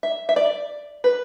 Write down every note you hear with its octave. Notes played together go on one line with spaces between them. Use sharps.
E5
E5
D5
B4